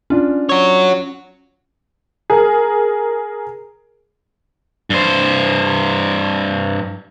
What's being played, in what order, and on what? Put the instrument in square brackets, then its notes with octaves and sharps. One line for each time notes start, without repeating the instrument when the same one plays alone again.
[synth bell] C#4 [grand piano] D4 F4
[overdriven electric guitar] F#4 C#5
[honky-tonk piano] G#4 A#4
[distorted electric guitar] G2 C5